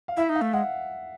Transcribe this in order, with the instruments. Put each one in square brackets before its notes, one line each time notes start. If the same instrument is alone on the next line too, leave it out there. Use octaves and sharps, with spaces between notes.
[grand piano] F5
[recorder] E4 [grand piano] E5
[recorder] D#4
[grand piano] F5
[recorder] A3
[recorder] G#3 [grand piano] F#5